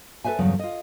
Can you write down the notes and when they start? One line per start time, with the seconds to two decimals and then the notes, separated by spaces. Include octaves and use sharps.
0.24 A4 B4 C5 E5 G#5
0.39 E2 G2 C#3 F#3
0.59 F4 D#5